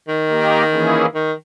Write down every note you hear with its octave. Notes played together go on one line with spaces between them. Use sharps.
D#3
A#3 D#4 G4 A#4
E3 A#3 C#4 E4 G#4
D#3